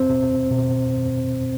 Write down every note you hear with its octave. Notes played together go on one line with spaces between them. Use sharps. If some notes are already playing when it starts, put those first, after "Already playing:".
Already playing: C4 C5
B2
B2